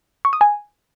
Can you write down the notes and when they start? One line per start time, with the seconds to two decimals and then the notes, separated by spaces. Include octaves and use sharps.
0.25 C#6
0.33 D#6
0.41 G#5